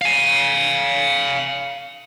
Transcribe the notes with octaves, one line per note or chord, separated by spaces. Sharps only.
F5 G#5